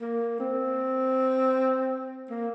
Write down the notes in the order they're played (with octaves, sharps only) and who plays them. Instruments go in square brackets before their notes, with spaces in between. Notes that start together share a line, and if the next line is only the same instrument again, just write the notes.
[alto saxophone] A#3
C4
A#3